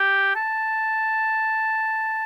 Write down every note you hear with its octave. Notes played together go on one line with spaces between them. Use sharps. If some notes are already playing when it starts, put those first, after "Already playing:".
Already playing: G4
A5